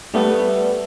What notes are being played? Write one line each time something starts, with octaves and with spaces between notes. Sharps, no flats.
G3 A3 B3